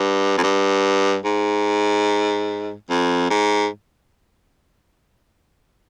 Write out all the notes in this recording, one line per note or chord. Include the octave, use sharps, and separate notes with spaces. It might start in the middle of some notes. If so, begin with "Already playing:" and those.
Already playing: G2
F2
G2
G#2
F2
G#2